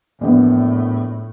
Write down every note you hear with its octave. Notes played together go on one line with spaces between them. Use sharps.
A#1 E2 A2 B3